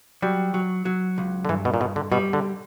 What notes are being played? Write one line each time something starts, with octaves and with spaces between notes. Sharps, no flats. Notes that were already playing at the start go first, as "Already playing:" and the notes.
F#3 G3
F#3
F#3
C#2
D3
G2 E3
B2
A#2
G2 B2
D3
B2 G3
D3